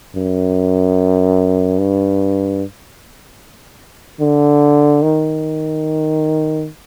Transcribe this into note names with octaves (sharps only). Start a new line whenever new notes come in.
F#2
G2
D3
D#3